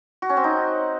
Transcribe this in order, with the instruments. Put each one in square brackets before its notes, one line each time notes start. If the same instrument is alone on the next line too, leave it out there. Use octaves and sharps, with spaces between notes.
[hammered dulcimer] F#4
C#4
C4
D#4